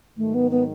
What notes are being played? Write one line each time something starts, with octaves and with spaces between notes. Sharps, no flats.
G#2 D#3 F#3 A3
B3
B3